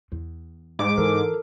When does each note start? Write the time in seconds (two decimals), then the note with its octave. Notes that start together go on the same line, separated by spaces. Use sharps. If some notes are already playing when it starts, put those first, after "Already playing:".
0.12 E2
0.79 G#2 D6
0.98 E3 A4 A#4